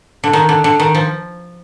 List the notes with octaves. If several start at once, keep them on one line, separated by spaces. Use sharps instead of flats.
D3
D#3
D3
D3
D#3
F3